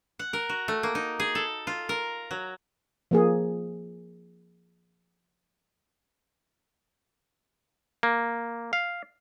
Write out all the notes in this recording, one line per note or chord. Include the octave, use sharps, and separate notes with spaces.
F#5
A#4
F#4
A3
A#3
D#4
G#4
A4
F4
A#4
F#3
F3 A#3 G#4
A#3
F5